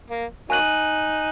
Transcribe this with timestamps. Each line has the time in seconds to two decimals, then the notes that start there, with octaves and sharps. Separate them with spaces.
0.10 A#3
0.50 F#3 A#3 D#4 G#5 F#6 D#7 F#7